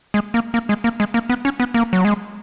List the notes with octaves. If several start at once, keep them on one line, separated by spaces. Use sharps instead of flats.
G#3
A#3
A#3
G#3
A#3
G#3
A#3
B3
C#4
B3
A#3
F#3
G#3